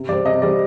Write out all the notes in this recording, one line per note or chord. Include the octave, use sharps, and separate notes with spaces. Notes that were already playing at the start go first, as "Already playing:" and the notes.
Already playing: C3
G3 C4 D5
C3 D#5
G3 C4 D5